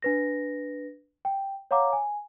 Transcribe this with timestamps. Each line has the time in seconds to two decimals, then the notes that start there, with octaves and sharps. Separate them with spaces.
0.02 D4 B4 A#6
1.25 G5
1.71 C#5 F5 F#5 A#5 D6
1.93 G#5